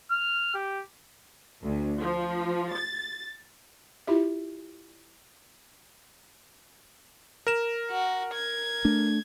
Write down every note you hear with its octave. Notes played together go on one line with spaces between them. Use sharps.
F6
G4
D2
F3
A6
E4 F4 G4 E5
A#4 E7
F#4
G#6
A3 D4